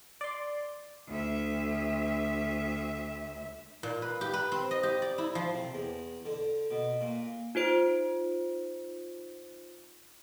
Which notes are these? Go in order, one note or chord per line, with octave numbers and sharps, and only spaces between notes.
D5 C6
D2 E5
A#2
B4
G4
B4
C4
D#5
G4
D5
E4
F3
C3
E2
D3
B2
A#2
D#4 F4 C5 D7